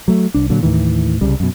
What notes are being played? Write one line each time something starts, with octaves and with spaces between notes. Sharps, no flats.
F#3 A3
C2 D4
A#2 D3 F#3
D#2 A2 D#3 E3
C2 C#3 G3
F#2 B2